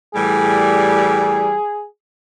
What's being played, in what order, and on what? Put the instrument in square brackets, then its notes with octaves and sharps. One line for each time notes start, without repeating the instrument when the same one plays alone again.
[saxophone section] A2 E3 G3 [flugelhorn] G#4